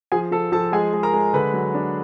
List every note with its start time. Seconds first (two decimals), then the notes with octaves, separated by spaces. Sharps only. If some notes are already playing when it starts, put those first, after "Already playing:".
0.12 F3 G#4 G#5
0.32 F3 A4 A5
0.52 F3 A4 A5
0.72 G#3 G#4 G#5
0.93 G#3
1.03 A#4 A#5
1.14 G#3
1.34 D3 B4 B5
1.54 F#3
1.74 D4